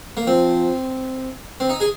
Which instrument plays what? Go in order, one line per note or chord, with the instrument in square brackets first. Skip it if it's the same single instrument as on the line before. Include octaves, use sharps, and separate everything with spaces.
[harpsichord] A#3
[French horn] F3 [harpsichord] C4
[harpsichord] C4
D#4
G#4